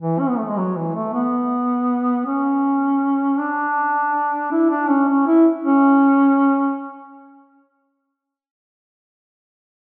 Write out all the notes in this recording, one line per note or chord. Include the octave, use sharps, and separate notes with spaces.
E3
C#4
B3
A3
G#3
F#3
E3
A3
B3
C#4
D4
E4
D4
C#4
C#4
E4
C#4